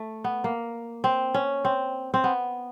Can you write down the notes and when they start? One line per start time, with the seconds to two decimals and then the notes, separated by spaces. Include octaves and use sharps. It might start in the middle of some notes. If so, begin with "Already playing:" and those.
Already playing: A3
0.24 B3
0.44 A#3
1.04 C4
1.34 C#4
1.65 C4
2.14 C4
2.24 B3